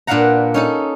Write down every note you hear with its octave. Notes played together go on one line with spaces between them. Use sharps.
A#2 D4 B4 F5 F#5 A#5
C#4 D#4 A4